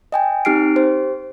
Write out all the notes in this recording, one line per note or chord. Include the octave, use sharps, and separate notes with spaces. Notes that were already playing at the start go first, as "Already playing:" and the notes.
D#5 G5 G#5
C4 D#4 G4 F6 C7 D7
G4 C5